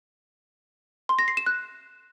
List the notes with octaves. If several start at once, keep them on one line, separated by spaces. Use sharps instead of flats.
C6
A#6
C7
E7
F#6